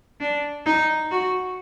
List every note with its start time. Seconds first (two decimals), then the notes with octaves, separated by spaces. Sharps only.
0.21 D4
0.66 D#4
1.11 F#4